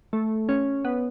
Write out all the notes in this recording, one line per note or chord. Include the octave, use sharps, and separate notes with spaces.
A3
C#4
B3